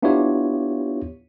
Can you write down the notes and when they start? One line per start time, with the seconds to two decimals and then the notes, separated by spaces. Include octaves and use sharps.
0.02 B3 D4 E4 F4 G4 C#5